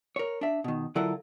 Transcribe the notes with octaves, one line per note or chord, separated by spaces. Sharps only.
A#4 C#5
D4 E5
B2 D#3
D3 F#3 E4 F4 A4 A#4